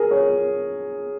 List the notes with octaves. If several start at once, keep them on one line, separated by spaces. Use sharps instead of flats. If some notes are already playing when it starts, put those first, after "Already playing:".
Already playing: G#4 A#4
C#5